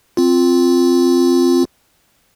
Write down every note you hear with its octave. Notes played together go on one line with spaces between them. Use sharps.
C4 F4